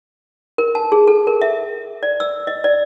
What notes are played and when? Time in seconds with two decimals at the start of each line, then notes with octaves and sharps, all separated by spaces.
0.58 A#4
0.75 A5
0.92 G#4
1.08 A4
1.27 A#4
1.42 E5
2.03 D5
2.20 E6
2.47 D#5
2.64 D5